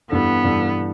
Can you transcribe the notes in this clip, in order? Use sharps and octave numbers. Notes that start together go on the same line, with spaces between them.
G2 E3 G3 B3 D4 A4
G2 E3 G3 D4 A4